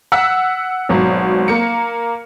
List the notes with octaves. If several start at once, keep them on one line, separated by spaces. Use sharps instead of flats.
F#5 E6 B6
G#1 B2 F#3
A#3 C#7